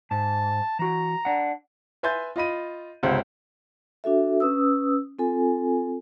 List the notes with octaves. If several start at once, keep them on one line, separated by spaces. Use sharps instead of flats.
G#2 A5
E3 F#4 A#5
D4 F#5
B4 E5 G#5 C6 G6 A6
F4 D#5 B5 D#7
G1 C#2 C3 C5 F#5
D4 F#4 A4 E5
C#4 B4 D#6 E6
C4 F4 A4 G#5